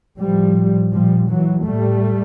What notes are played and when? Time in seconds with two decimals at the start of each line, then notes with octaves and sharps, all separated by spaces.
0.19 A2 F3 G3
0.93 A#2 F3 G3
1.29 E3 F#3
1.67 A2 G3 A3